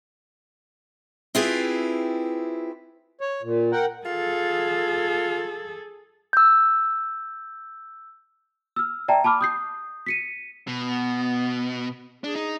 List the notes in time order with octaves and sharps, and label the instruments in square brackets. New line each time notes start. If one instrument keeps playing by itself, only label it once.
[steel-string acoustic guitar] C4 E4 F4 G4 G#4 B4
[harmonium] C#5
A#2
A#4 F#5 G5
[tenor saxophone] F4 [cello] G#4 A4
[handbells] E6 G6
[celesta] E6 F6
D5 E5 G5 A5 A#5
A5 B5 D6 F6
D#6 G6 C7
B6 C#7 D#7
[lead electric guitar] B2
[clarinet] B3
[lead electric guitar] D4 [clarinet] G#4
[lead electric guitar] D#4